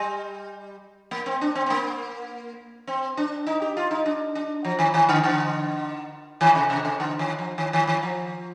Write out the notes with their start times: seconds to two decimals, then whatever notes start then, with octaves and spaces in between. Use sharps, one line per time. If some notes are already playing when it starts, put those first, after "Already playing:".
Already playing: G3
1.11 A#3
1.26 C4
1.41 D4
1.55 C4
1.66 C4
1.70 A#3
2.87 C4
3.17 D4
3.47 D#4
3.62 G4
3.77 F4
3.91 D#4
4.06 D4
4.35 D4
4.65 F3
4.79 D#3
4.94 D#3
5.09 D3
5.24 D3
6.41 D#3
6.55 C3
6.70 C3
6.85 C3
7.00 D3
7.19 D#3
7.38 F3
7.58 D#3
7.73 D#3
7.87 D#3
8.03 F3